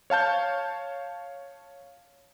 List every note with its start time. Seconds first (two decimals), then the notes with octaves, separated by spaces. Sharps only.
0.10 C#5 F5 A5 G6